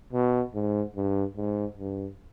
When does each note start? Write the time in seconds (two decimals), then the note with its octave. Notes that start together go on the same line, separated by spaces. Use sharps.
0.13 B2
0.54 G#2
0.95 G2
1.37 G#2
1.78 G2